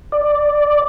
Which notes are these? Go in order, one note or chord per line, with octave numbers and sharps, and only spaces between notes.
D5